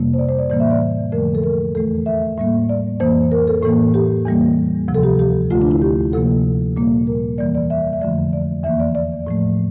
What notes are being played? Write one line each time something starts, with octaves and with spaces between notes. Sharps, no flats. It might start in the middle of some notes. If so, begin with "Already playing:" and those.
Already playing: F2 C3 G3 A#3
C5
D5
C5
D5
A2 E3 G3 A#3 D5
E5
D5
F2 D3 F3 A3 A#4
A4
A#4
E2 E3 A3 A4
E5
A2 G3 A#3 E5
D5
F2 E3 A#3 C5
A#4
A4
A2 E3 A#3 A4
G4
E2 E3 G3 A#3
D2 C3 F3
A4
G4
G4
D2 D3 A3 F4
D4
E4
G4
D2 C3 F3 A#3 A4
A#2 G3 A#3
A#4
E2 E3 G3 A#3 D5
D5
E5
E5
F2 D3 F3 A3 D5
D5
E2 E3 A#3 E5
D5
D5
A2 F3 A3